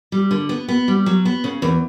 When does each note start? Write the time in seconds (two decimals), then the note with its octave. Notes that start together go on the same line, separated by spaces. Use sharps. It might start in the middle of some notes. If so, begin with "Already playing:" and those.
0.12 G3
0.31 D3
0.49 B3
0.69 B3
0.88 G3
1.06 F#3
1.25 B3
1.44 C#3
1.62 E2